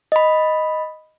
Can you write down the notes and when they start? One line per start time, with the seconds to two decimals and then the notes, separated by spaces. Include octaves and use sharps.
0.12 D#5 B5